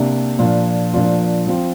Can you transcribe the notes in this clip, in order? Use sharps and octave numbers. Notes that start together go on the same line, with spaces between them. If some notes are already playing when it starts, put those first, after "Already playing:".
Already playing: C3 A#3 D4
A#2 F3 D4 F4
A#2 F3 D4 F4
F3 C4 F4